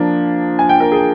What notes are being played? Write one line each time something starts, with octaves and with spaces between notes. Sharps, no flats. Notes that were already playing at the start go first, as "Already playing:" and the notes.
Already playing: F3 A#3 D4
G#5
G5
A#4
G#4